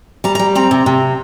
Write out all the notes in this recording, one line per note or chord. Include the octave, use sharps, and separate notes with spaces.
G3 A#5
G3 A#5
C4 A#5
C3
C3